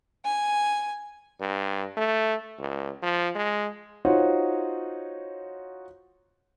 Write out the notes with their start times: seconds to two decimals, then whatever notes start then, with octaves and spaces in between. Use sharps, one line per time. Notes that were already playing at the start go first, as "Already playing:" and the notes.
0.25 G#5
1.40 G2
1.97 A3
2.58 C#2
3.03 F3
3.35 G#3
4.05 D#4 F4 F#4 C5 C#5